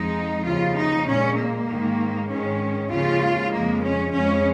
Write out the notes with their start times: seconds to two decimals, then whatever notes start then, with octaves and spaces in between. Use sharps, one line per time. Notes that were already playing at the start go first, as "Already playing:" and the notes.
Already playing: F2 F3 G#3 D#4
0.44 D#2 C#3 F3 F4
0.76 D#4
1.06 A#2 G#3 C#4
1.36 A#3
1.67 G#2 D#3 G#3
2.29 G#2 D#3 G#3 C#4
2.90 D#2 C#3 F3 G#3 F4
3.52 F2 C#3 F3 G#3 A#3
3.82 C#4
4.13 F2 C#3 G#3 C#4